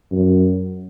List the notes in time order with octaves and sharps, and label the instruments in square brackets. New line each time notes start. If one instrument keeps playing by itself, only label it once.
[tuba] F#2